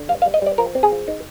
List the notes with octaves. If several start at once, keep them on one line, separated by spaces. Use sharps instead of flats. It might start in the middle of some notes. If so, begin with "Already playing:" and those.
Already playing: D3
G2 F5
F5
G3
D#5
G3 D5
F3 A#4
C4
G#4
F3
D#4